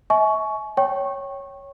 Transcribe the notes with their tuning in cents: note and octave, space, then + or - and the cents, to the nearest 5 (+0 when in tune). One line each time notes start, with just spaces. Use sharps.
E5 -40 G#5 +40 C#6 +10
C#5 +0 G5 -15 C#6 -20